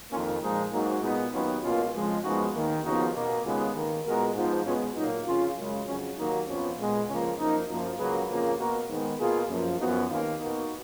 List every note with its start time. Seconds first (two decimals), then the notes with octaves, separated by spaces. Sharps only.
0.11 F2 D#3 A#3 C#4 F4
0.42 A#2 F3 G#3 D#4
0.72 G#2 F#3 A#3
1.03 A#2 G#3 B3 D#4
1.33 D#2 D#3 F#3 B3 C#4 F4
1.63 C#2 B2 A#3 C#4 F4
1.93 F2 C#3 F3 G#3
2.24 F#2 F3 G#3 B3 D#4 F#4
2.54 D#2 D#3 A#3
2.84 D#2 C#3 F3 B3 D#4 F#4
3.15 B2 A#3
3.45 D#2 C#3 G#3 B3 F4 G#4
3.75 D#2 D#3 A#3
4.05 A#2 G#3 B3 F#4 A#4
4.35 G#2 F3 B3
4.65 B2 G#3 B3 C#4 F4
4.96 A#2 F#3 A#3 D#4
5.26 F2 C#3 F3 C#4 F4
5.56 F#2 C#3 G#3
5.87 F2 C#3 F#3 C#4
6.17 D#2 D#3 F#3 A#3 D#4
6.47 F2 F3 B3 C#4
6.77 A#2 G#3 B3
7.07 C#2 C#3 F3 A#3 C#4
7.38 F#2 F3 A#3 D#4
7.69 F#2 F3 A#3
7.98 C#2 C#3 F#3 A#3 G#4 B4
8.29 F2 C#3 F3 A#3
8.58 B2 A#3 F#4 A#4
8.89 G#2 D#3 G#3 B3
9.19 B2 A#3 F4 G#4
9.49 F#2 F3 A#3
9.80 F#2 F3 B3 D#4 F#4
10.10 D#2 D#3 A#3 C#4 F4
10.40 B2 A#3 D#4 F#4